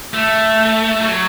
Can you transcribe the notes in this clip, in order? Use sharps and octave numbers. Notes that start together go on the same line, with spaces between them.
A3
F#3